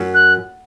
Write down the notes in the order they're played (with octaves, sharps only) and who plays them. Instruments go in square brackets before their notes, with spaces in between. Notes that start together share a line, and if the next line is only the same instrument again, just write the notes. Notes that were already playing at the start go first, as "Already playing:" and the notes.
Already playing: [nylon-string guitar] F#2
[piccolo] F#6